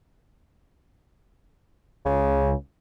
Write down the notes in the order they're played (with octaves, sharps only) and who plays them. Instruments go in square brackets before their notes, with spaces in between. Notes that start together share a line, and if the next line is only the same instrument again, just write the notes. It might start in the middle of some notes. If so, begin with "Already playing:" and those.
[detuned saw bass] C#2 [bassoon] C#3